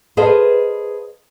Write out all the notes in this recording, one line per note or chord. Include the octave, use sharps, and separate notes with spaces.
G#4 A4 B4 C5 D#5 F5